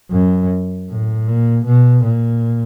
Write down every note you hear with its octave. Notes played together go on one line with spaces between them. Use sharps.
F#2
A2
A#2
B2
A#2